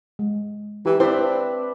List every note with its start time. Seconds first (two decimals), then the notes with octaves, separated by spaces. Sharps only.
0.19 G#3
0.86 E3 G4
1.00 C4 D4 E4 B4 C5 E5